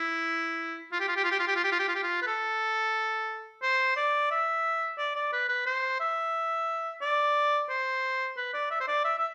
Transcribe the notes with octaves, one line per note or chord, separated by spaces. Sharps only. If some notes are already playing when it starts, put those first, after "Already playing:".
Already playing: E4
F4
G4
F4
G4
F4
G4
F4
G4
F4
G4
F4
G4
F4
G4
F4
B4
A4
C5
D5
E5
D5
D5
B4
B4
C5
E5
D5
C5
B4
D5
E5
C5
D5
E5
E5